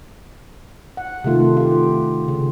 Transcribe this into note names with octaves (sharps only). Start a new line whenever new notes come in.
F#5
C3 D#3 A3 F4
F4 G4
C#3